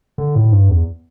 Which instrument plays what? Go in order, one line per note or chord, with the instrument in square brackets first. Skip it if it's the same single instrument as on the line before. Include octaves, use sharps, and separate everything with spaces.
[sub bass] D3
A2
G2
E2